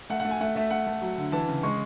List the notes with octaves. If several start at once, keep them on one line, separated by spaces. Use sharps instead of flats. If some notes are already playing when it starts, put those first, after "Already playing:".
A3 F#5
A3 F#5
G#5
A3 F#5
A3 E5
A3 F#5
A3
F#3
D3
E3 A5
C#3
G#3 C#6